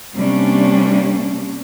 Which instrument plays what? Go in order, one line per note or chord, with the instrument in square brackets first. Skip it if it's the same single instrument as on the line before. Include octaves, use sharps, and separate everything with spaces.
[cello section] C3 G3 A#3 C#4 D4